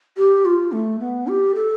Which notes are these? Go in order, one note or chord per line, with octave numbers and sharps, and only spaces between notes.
G4
F4
A3
B3
G4
A4